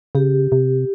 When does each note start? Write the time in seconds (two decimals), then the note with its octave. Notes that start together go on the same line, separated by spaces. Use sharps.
0.15 C#3 G4
0.52 C3